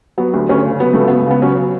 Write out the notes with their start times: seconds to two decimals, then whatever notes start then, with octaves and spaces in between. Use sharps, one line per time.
0.18 F#3 B3
0.34 D2
0.49 D2 C#4
0.65 C#3
0.80 F#3 B3
0.93 C#2 A3
1.08 C#2 B3
1.26 C#3 B3
1.42 F#3 C#4